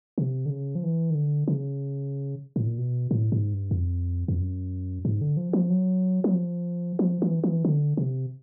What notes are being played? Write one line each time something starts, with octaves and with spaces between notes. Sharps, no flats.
C3
D3
C#3
F3
E3
D#3
D3
C#3
A2
A#2
B2
A2
G#2
G2
E2
F2
F2
F#2
G#2
D3
F3
F3
F#3
F#3
F3
F3
E3
E3
D3
C3